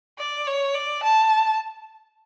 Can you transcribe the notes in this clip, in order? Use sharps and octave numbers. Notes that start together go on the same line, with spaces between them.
D5
C#5
D5
A5